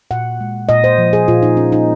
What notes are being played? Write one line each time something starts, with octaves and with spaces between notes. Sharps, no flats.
A#2 F#5
G#3
A#2 D#5
C5
F3
G#4
A#2 F4
D#4
A#3 C#4
D#4